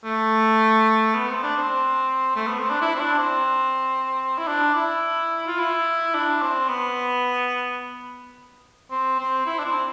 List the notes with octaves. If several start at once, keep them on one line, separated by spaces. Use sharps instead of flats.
A3
B3
C4
D4
C4
A3
B3
C4
D4
E4
C4
D4
C4
E4
D4
E4
F4
E4
D4
C4
B3
C4
C4
E4
D4
C4